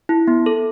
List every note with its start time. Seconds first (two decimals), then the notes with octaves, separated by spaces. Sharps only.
0.09 E4
0.27 B3
0.46 A4